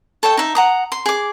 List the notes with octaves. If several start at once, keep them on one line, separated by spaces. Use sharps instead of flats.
A4 C#5 E5 G5
D#4 E5
F#5 A#5 D#6
C6
G#4 D6